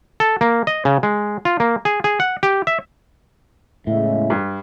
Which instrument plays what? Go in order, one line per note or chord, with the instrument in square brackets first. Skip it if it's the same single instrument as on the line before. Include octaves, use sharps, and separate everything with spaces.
[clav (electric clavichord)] A4
A#3
D#5
C#3
G#3
F4
A#3
G#4
G#4
F#5
G4
E5
[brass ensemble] E2 C#3 G#3 [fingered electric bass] A2 [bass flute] E5
[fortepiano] G2